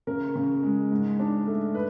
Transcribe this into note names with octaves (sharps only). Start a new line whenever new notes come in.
C#3 A#4
C#3
G#3
G#2
D4
A3
B4